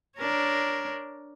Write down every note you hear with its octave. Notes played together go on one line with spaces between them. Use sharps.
D4 A#4 C#5